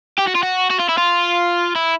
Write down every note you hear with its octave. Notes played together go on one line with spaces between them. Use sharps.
G4
F#4
F4
F#4
F#4
F4
E4
F4
E4